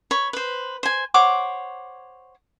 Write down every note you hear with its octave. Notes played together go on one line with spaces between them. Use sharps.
C#5 B5
B4 C5
C5 G#5
C5 C#5 F#5 D6